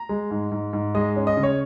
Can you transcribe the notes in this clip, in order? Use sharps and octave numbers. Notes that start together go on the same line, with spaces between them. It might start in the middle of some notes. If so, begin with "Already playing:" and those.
Already playing: A#5
G#3
G#2
G#2
G#2
G#3 D#5
C#4
D#5
C#3
C#5